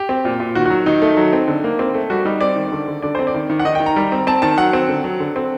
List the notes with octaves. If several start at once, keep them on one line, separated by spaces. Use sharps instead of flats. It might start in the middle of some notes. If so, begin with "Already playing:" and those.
Already playing: G4
C4
A#2
A#2
D#3 F#4
F#4
F#3
D#3 D#4
A3
F#3
C4
D3
A#3
C4
A3
G3 F#4
G3 D#4
C4 D5
D#3
D3
D3
D3 D5
C4 C5
D5
D#3
D#3
F#5
D#3 D#5
G5
D#3
A#5
G3
C4
C4 A5
D#3 A5
F#3 F#5
C4
D3
F#3
D3
C4